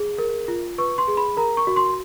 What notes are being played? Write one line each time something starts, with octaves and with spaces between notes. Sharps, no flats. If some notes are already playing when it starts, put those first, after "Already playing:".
Already playing: G#4
A#4
F4
B4 C#6
C6
G#4
B5
A#4 A#5
C#6
F#4
C6